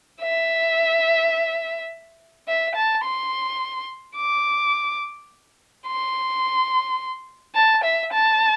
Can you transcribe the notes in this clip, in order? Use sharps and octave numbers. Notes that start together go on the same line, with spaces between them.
E5
E5
A5
C6
D6
C6
A5
E5
A5